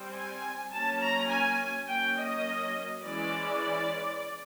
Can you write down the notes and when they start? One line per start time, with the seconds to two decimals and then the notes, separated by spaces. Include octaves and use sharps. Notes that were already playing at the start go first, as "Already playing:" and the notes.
Already playing: G3 C4
0.14 G#5
0.72 F#3 A#3 C#4 A5
1.00 A#5
1.29 G#5
1.88 F#3 A#3 C#4 G5
2.16 D#5
3.03 E3 G#3 C#4 D5